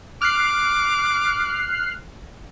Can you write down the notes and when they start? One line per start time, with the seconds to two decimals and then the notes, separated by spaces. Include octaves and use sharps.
0.22 D6 F6 F#6 C7